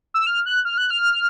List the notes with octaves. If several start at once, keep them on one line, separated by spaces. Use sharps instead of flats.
E6
F6
F#6
F6
F#6
F6